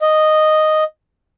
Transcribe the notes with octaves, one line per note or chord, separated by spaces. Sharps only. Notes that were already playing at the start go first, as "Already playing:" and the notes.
D#5